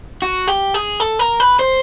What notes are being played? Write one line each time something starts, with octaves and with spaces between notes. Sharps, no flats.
F#4
G4
G#4
A4
A#4
B4
C5